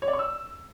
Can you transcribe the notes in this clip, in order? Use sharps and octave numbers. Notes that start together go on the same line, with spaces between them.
C#5
D5
C#6
E6